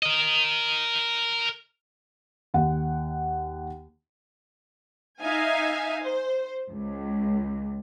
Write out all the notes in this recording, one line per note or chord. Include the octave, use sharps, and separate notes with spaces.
A#4 D#5
D#2 F#5
D#4 E5 F5 G#5
C5
C#2